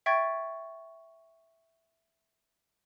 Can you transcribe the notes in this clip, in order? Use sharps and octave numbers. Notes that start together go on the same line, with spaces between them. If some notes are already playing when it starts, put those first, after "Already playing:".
E5 G5 C#6 G#6 A6